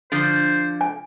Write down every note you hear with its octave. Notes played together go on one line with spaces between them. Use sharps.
D3 F3 C5
G#5